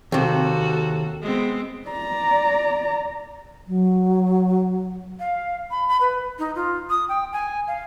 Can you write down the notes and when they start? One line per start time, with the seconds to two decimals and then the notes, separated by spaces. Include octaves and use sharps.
0.12 D#2 C3 A#3 F#4 A4
1.21 G#3 B3 C4
1.89 D5 A#5
3.68 F#3
5.20 F5
5.71 B5
5.88 B5
6.01 B4
6.39 D#4
6.56 F4
6.90 D#6
7.09 G5
7.33 G#5
7.68 F5